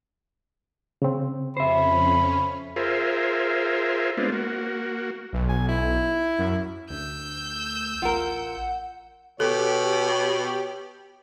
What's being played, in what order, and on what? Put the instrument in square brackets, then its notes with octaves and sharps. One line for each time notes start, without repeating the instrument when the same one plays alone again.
[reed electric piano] C#3 C4
[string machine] F2 C#4 [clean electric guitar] C5 E5 [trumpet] B5
[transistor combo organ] F4 G#4 A#4 C5 E5
G#3 B3 C4 D4 F4
A#3 F#4
[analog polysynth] B1
[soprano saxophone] G#5
E4
[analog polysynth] F#2
[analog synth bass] D2 [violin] E6 G6
[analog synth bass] A1 [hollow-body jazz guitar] F4 A#4 [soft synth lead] F#5
[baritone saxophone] B2 [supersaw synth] G4 [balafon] A4 [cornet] C#5